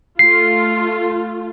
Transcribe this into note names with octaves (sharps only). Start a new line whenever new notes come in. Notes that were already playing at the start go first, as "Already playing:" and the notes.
A3 F4 C7